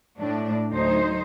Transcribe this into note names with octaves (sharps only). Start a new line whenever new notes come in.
A2 D4 D5
D2 F#3 D#4 C5